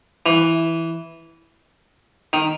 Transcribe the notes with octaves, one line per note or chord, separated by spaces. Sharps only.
E3
D#3